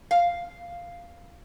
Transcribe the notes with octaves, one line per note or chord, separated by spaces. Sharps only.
F5